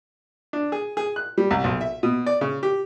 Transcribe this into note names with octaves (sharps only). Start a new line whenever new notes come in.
D4
G#4
G#4
F#6
G3
C2
B1
E5
B2
D5
C#3
G4